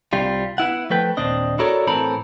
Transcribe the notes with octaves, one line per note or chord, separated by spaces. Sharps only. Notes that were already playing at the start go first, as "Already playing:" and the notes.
C2 C3 G3 F4
B3 E4 F#5
F3 A3 B4 G5
D#2 A#2 C4 D4 D#5
E4 F#4 A4 A#4 C#5 D5
A2 E3 C4 A4 A#4 B5